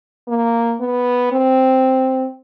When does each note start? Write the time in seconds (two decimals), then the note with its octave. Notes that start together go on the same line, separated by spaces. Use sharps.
0.28 A#3
0.81 B3
1.32 C4